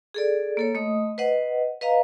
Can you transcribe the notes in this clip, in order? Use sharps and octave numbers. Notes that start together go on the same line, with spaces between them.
G#4 A4 D5
A#3 A4 C#5
A3 D#5 D#6
B4 C5 D#5 F#5
B4 D#5 F5 A#5